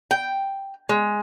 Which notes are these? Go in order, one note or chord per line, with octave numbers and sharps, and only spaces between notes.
G5
G#3